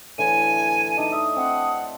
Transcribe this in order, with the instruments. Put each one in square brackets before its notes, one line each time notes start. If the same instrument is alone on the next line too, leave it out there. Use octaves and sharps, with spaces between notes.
[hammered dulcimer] A2 D3 E3 [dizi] G#5 [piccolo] D#7
[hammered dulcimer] D4 D#4 A5
[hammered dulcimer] E5 [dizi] D#6
[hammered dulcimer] C4 [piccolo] F#5